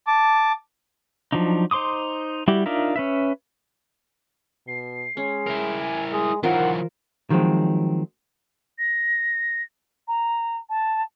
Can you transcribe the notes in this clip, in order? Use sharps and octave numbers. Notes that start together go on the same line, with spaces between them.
A5 D6
F3 F#3 D4 D#4
D#4 C5 C6 D6 D#6
G3 E4 F#4 G4
D4 D#4 F4 A#4 E5
C#4 B4 E5
B2 C7
G#3 C#4
E4 A#4
G#5
G#3 D#6
D#3 E3 F#3 F4 A#4 C5 F#5
D#3 F3 F#3 G#3 C4
A#6
A#5
A5